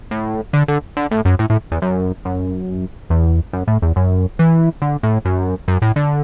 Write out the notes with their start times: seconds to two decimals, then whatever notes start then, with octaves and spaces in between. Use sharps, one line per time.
0.11 A2
0.53 D3
0.68 D3
0.97 D3
1.11 A2
1.25 F#2
1.39 A2
1.50 A2
1.72 E2
1.82 F#2
2.25 F#2
3.10 E2
3.53 F#2
3.68 A2
3.82 E2
3.96 F#2
4.39 E3
4.82 D3
5.03 A2
5.25 F#2
5.68 F#2
5.82 A2
5.96 D3